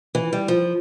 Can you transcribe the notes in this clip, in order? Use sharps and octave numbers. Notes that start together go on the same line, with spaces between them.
E3
G3
F3